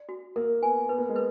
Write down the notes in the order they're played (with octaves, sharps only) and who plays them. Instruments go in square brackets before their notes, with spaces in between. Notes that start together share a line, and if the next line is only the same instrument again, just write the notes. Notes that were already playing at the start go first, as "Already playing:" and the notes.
Already playing: [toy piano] D5
F#4
[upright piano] A#3 [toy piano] A#4
[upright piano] B3 [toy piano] G#5
[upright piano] B3 [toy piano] B4
[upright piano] A#3
G#3
[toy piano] B4